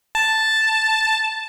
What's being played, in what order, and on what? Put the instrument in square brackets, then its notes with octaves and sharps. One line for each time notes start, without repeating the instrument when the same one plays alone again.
[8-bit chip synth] A5